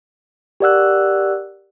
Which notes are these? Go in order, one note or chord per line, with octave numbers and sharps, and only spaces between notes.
G4 A#4 D5 F#5 E6 F#6